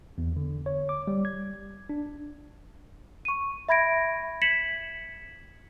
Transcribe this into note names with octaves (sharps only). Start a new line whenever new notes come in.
E2
D3
C#5
D6
G3
G#6
D4
C#6 D#7
E5 B5 G#6 A#6 D7
G#6 B6 C#7 E7 F#7